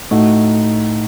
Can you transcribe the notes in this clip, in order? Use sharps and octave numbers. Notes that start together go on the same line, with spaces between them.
A2 A3 D#4 F#4